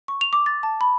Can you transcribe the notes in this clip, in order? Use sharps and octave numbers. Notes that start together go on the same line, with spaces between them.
C#6
F7
D6
A6
A5
B5